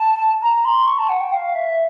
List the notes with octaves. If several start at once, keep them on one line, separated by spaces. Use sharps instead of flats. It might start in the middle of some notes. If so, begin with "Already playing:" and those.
Already playing: A5
A#5
C6
C#6
A5
F#5
G5
F5
E5